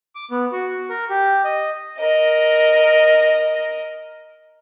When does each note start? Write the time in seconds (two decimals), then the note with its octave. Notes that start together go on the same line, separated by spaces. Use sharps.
0.15 D6
0.31 B3
0.52 F#4
0.90 A#4
1.09 G4
1.45 D#5
1.98 A#4 D#5